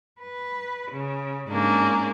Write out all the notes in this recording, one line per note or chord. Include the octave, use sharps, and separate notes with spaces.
B4
C#3
G#2 A#3 C#4 D4